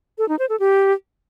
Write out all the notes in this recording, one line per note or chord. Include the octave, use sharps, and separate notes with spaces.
A4
D#4
C5
A4
G4